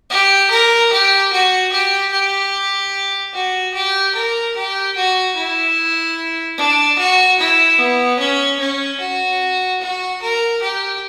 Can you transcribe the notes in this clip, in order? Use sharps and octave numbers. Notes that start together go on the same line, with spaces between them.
G4
A#4
G4
F#4
G4
G4
F#4
G4
A#4
G4
F#4
E4
D4
F#4
E4
B3
C#4
C#4
F#4
F#4
A#4
G4